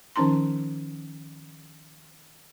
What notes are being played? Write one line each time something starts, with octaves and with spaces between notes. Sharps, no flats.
D#3 F3 C#4 D#4 A#5 C6